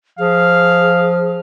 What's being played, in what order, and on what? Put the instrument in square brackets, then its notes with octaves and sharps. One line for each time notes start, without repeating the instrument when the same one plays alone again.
[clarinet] F3 [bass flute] G#4 [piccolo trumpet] F5